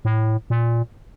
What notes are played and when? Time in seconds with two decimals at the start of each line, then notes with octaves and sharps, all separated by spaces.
0.05 A2
0.50 A#2